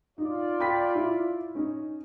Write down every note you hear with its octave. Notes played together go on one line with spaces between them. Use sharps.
D#4 F4 D5
G5 B5 B6
E4
C#4 D#4